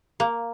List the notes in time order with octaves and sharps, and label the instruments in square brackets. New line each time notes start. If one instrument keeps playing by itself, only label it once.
[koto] A#3